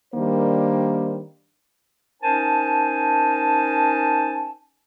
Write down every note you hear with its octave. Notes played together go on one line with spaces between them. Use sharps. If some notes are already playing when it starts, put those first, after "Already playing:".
D#3 G3 A#3 D4 D#4 C5
C#4 D#4 A#4 C5 G#5 A5